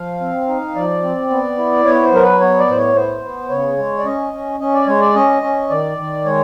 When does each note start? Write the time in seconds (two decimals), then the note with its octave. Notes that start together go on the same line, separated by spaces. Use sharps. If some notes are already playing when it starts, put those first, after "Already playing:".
Already playing: F3 F5
0.21 C4
0.48 D#4
0.75 F3 D5
1.03 C4
1.30 B3
1.58 E4
1.85 B3 C#5
2.03 C5
2.12 F#3 A#4
2.22 B4
2.40 B3 C#5
2.59 D5
2.67 A2 C5
2.77 C#5
2.95 B3 C5
3.23 B3
3.50 C#3 C#5
3.77 G#3
3.98 D5
4.05 C#4 D#5
4.33 C#4
4.60 C#4 D#5
4.74 D5
4.86 G#3 C#5
5.00 D5
5.15 C#4 D#5
5.43 C#4
5.70 D#3 D5
5.97 D#3
6.25 G#3 C#5